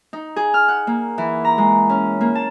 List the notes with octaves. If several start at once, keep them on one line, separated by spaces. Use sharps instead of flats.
D#4
G#4
F6
F#5
A#3
E3
A#5
G#3
C#4
A#3
A5